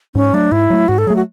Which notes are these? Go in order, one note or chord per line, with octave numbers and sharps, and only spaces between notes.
G#2 C#4
F#3 A3 D4
G#2 E4
F#3 A3
G#2 F#4
A4
F#3 A3 G#4
F#4